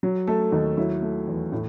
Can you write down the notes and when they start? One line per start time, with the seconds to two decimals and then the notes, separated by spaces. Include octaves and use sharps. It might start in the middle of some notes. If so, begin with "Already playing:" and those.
0.03 F#3
0.27 A3 A4
0.52 D#2 D#4
0.77 F#3 E4
1.02 A3
1.28 E2
1.52 A2